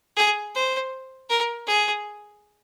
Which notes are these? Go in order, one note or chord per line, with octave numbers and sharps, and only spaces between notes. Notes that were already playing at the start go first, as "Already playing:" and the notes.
G#4
C5
A#4
G#4